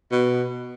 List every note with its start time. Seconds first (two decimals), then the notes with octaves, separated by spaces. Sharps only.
0.12 B2